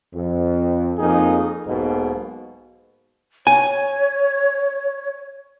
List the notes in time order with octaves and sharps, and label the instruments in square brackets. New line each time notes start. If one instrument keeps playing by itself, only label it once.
[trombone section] F2
F2 A#3 D#4 G#4
B1 G#2 B2 A#3
[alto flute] C#5 [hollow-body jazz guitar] G#5